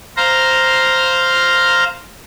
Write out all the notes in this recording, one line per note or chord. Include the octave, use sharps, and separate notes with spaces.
C5 F5 A#5